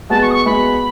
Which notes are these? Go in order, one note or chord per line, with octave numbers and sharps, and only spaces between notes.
G#3 B3 F#4 A5
C#6
D#6
C#6
G#3 B3 F#4 B5